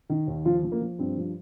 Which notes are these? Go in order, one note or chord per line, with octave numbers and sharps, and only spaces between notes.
D#3
D#2
F3 F4
F3
A#3
F3
G2 C4
F3